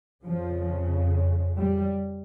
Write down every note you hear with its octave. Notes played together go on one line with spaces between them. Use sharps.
F2 C#3 F3
G3